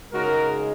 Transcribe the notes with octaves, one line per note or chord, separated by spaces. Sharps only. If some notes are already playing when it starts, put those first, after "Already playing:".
C#3 G#3 D#4 F#4 A#4